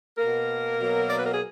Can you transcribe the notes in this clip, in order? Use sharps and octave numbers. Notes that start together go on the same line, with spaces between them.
B2 A#3 A#4
B2 F#3 A#3
D5
B4
A#4
G#4